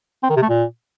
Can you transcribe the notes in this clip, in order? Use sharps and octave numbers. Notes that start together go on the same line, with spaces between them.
C4
D#3
C3
A3
A#2